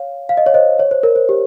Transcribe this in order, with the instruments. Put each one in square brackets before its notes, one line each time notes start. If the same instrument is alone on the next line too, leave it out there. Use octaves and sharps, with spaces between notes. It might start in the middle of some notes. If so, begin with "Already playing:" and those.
Already playing: [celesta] C#5 F5
F5
D#5
C#5
C5 D#5
C#5
C5
A#4
C5
G4